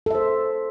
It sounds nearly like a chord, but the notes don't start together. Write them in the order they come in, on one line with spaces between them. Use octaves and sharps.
A4 E5 C5